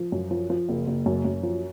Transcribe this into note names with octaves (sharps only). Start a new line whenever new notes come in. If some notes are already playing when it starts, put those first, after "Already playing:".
Already playing: F3
F#2
F3
F3
F#1
F#1
F#2
F#2
F3